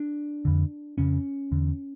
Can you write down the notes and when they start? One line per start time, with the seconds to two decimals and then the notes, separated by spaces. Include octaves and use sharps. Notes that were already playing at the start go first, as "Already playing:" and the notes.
Already playing: D4
0.45 F2 D3
0.98 F2 C#3 C#4
1.52 E2 D3